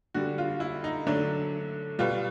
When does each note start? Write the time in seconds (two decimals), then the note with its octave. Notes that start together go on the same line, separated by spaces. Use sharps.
0.14 D3 G3 F#4
0.38 F4
0.60 E4
0.84 D#4
1.06 D3 F#3 A3 D4
1.99 B2 G3 F4